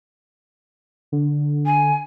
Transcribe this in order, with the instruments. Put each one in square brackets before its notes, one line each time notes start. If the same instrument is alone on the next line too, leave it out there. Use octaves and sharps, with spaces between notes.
[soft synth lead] D3
[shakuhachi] G#5